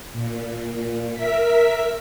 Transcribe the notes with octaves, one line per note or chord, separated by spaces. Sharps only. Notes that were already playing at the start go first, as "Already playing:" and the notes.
A#2
A#4 E5 B6